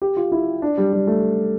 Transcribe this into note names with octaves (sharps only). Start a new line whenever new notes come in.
G4
F4
E4
D4
G3
G3
A3